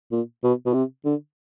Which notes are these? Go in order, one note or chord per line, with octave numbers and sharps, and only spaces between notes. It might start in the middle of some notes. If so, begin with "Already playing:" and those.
A#2
B2
B2
C3
D3